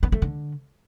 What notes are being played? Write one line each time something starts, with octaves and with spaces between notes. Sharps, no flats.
B3
A3
D3